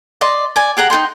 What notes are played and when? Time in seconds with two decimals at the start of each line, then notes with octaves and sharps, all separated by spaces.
0.21 D5 D#5 C6
0.56 D5 G#5
0.77 G4 G#4 F#5 A#5
0.90 D#4 A4 G5 C6